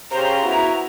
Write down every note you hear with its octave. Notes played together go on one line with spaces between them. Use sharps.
C#3 G4 C5 A#5
B3 E4 F#4